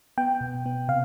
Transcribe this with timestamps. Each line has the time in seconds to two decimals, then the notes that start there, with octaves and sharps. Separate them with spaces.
0.18 B3 G5
0.41 B2
0.66 B3
0.88 C3 F5